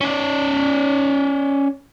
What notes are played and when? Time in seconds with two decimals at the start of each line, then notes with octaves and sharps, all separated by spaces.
0.01 C#4 D5